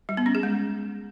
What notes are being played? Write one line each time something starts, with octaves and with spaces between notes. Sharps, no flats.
G3
B3
C#4
G#4
G#3